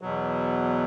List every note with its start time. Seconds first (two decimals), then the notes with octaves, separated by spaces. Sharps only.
0.01 E2 B2 F#3